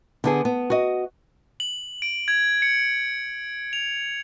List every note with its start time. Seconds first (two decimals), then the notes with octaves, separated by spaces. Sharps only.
0.24 D3 B3 G#4
0.45 B3
0.70 F#4 D#5
1.60 F#7
2.02 D7
2.28 G#6
2.62 C#7
3.73 F7